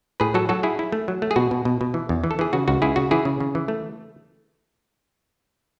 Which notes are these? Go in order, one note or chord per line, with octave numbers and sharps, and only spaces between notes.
A2 G#4 B4
F#3 F#4 A4
F#3 F#4 A4
E4 G#4
E4
A3
F#3
A3
G#4
B2 F#4
B2
B2
B2
E3
E2
E3
A4
E3 G#4
C#3 F#4
C#2 F#4
C#2 E4 G#4
C#3 F#4
E3 E4 G#4
C#3
C#3
E3
A3